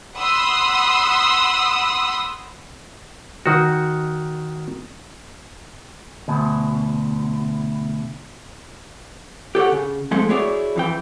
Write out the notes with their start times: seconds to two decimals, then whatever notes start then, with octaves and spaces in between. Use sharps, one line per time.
0.16 F#5 B5 C6 D#6 E6
3.46 D#3 F#4
6.28 D2 B2
9.55 G4 A4 C#5 F#5
9.72 C#3
10.11 F3 G#3 A3 C4
10.29 E4 F#4 G#4 C#5 D5
10.76 F2 E3 G5